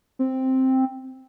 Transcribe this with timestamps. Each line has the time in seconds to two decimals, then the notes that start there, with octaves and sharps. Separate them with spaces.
0.19 C4